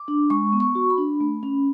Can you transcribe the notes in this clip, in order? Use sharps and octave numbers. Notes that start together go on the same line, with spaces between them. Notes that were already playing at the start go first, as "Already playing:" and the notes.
Already playing: D6
D4
G#3 C#6
B3
C#6
F#4
B5
D4
A3
C#4